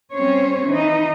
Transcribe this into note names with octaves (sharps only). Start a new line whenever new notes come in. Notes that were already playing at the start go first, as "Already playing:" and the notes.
G3 C4 C#4 C5 C#5
E3 D#4